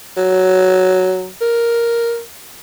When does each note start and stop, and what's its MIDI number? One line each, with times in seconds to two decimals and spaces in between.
0.17 1.29 54
1.41 2.20 70